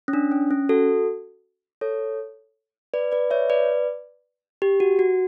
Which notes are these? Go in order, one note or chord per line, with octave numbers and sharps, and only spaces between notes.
C#4
D4
C#4
C#4
F#4 A4
A4 C#5
B4 D5
B4 D5
C#5 E5
B4 D5
G4
F#4
F#4